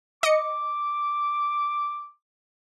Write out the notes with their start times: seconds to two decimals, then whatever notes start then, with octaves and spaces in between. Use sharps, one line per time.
0.23 D#5 D6 C#7